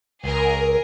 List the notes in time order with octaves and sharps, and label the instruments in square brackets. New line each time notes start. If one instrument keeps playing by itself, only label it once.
[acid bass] C#2 [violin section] G#4 A#4